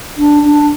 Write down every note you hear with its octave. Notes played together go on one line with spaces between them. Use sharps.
D4
D4